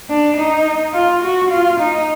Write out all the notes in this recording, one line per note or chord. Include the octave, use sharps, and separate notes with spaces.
D4
D#4
F4
F#4
F4
D#4